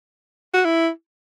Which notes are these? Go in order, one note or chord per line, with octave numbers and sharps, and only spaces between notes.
F#4
E4